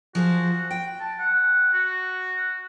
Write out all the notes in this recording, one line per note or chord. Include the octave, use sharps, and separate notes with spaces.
F3 F#4 G#4 C5
G5
A5
F#5
F#4